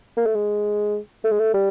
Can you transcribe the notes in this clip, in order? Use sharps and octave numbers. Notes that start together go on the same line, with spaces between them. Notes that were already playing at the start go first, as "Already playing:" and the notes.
A#3
A3
G#3
A3
G#3
A3
G3